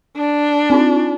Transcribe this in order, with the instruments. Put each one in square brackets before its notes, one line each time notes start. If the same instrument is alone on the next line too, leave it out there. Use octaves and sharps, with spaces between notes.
[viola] D4
[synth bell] C4 D#4 F4